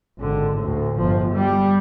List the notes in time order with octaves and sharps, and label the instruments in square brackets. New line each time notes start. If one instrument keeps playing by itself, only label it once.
[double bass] G#1 D3
D2 A2
G1 F3
G3